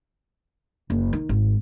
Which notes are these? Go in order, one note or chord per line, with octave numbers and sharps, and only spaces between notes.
F#1
D#3
G#1